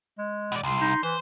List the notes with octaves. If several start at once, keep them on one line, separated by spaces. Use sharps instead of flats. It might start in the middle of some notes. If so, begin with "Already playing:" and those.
G#3
B2 D5
C2 C6
D#4
E3 C5